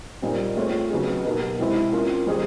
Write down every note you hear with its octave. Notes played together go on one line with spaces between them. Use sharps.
A#2 G3 C4 D#4
A3 C4 F4 G#4 C#5
C#3 F#3 B3 D#4 G#4
B2 F#3 A#3 D#4 G4
C3 E3 G#3 C4 E4
A#3 C#4 F4
D#3 G3 C4 D#4 G#4